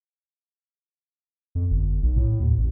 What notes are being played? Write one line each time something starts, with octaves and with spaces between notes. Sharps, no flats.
F2
G1
B1
A2
D#2
A1